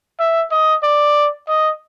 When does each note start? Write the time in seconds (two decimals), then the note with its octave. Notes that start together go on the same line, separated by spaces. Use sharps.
0.19 E5
0.52 D#5
0.83 D5
1.48 D#5